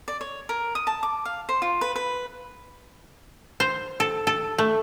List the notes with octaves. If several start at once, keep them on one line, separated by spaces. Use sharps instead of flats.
D5
C#5
A#4
D#6
A5
D6
F5
C5
F4
B4
B4
C5
A4
A4
A3